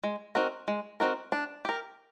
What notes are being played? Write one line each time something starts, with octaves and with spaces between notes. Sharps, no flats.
G#3
C4 D#4 F#4 A#4
G#3
C4 D#4 F#4 A#4
D4
G4 A#4